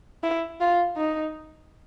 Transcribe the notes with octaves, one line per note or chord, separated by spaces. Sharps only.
E4
F4
D#4